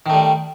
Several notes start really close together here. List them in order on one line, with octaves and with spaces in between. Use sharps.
D#3 A3 G3